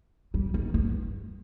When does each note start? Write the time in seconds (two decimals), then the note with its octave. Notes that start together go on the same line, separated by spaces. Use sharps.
0.34 G3
0.54 D#3
0.74 G2